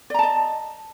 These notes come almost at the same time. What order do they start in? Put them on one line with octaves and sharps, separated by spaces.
D5 A#5 A5 D#5